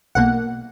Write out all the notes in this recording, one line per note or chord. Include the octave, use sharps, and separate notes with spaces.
B1 B2 A#3 F#5